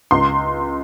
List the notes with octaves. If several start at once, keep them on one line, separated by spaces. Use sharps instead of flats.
C#2 C6